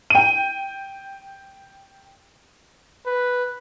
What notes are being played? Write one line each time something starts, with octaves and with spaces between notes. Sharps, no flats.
G5 D#7
B4